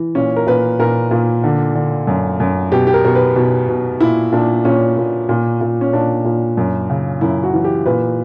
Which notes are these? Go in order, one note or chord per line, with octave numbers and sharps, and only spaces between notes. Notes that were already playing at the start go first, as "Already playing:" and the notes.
Already playing: E3
A#2 C#4
A#4
A#2 B4
A#2 A#4
A#2
D3
D3
F#2
F#2
B2 G4
G4
A#4
B2 A#4
B4
B2
B2
A#2 E4
A#2 D4
A#2 C#4
A#2
A#2
A#2
C#4
A#2 D4
A#2
F#2
C#3
F#2 E4
F#4
E3
G4
A#2 B4